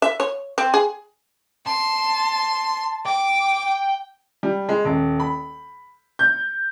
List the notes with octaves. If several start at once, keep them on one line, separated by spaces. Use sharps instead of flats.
E5
C#5
C4
G#4
A5 C6
G5 D6
G3
G#3
D#1
B5
G6